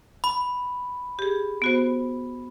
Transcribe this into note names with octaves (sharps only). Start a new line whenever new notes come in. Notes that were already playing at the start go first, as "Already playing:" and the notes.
B5
G4 G#4
B3 F#4 C5